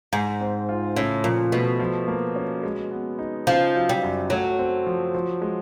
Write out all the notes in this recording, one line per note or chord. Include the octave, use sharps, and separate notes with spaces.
G#2 G#3
C4
F4
A2 C#3
A#2 F3
B2 A3
F3
A#3
C#4
G#3
B3
D#4
C#3 F3
F#3
G3
F#2
F#3 A3
C4
F3
F3
G#3